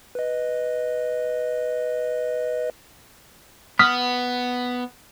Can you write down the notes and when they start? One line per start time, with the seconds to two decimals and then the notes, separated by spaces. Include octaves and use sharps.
0.15 B4 D#5
3.79 B3 D#6 F6 B6